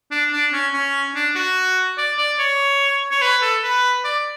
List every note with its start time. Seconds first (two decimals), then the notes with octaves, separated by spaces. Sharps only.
0.11 D4
0.32 D4
0.53 C#4
0.73 C#4
1.15 D4
1.35 F#4
1.98 D5
2.18 D5
2.39 C#5
3.11 C#5
3.22 B4
3.42 A4
3.63 B4
4.04 D5